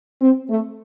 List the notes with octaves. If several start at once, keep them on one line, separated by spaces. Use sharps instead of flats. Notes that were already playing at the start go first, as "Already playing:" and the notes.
C4
A3